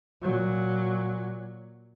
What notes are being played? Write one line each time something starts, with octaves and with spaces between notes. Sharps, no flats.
A#2 F#3